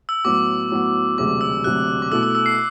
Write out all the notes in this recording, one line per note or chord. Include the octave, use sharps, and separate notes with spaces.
E6
A2 F#3 B3 F#4 D6
A2 F#3 B3 F#4
E1 D2 C3 F#3 D6
E6
E1 D2 C3 F#3 F#6
D6
B2 A3 E4 A4 E6
E6
E6
C7